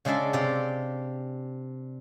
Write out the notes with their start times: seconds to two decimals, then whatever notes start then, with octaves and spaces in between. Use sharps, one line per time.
0.05 C#3 G#3 D4 D5 E5 A5
0.33 C3 G4 D5 F5